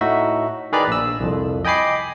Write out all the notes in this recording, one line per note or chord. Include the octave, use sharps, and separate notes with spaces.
A2 D#4 F#4 E5
D#3 G#4 B4 D5 A#5 B5
A#1 E6
C2 F2
D#5 G5 G#5 B5 D6 C7